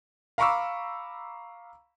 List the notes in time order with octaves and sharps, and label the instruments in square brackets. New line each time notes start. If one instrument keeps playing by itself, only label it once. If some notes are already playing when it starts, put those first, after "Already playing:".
[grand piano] F5 A#5 B5 C#6 D6 E6